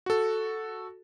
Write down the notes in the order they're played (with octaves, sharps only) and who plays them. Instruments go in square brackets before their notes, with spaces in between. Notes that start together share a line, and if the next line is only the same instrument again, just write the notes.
[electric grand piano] F#4 A4